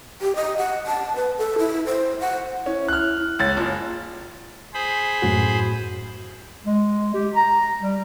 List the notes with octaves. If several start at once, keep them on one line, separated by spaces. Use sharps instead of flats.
G4
D#5
F#5
A5
B4
A4
E4
C5
F#5
C#4 E4
F6 F#6
C#2 C#5 A6
F#1 F4
G#4 C5 B5
F#2 A2 F#4
G#3
G4
A#5
G3